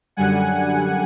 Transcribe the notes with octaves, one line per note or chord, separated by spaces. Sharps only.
F#2 D3 G3 F#5 G#5